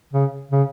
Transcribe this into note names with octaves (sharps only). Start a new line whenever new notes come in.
C#3
C#3